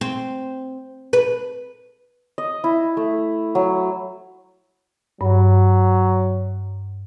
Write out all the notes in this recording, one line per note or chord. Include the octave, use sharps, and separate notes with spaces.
C4
B4
D#5
E4
A3
F#3
G2 F#3